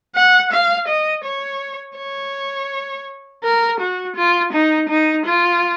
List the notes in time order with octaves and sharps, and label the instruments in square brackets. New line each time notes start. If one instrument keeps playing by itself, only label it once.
[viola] F#5
F5
D#5
C#5
C#5
A#4
F#4
F4
D#4
D#4
F4